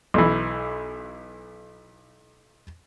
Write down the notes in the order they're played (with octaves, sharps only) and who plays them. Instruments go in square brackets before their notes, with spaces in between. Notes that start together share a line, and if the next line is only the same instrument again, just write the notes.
[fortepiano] B1 E3